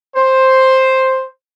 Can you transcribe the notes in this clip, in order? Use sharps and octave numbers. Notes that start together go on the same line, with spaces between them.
C5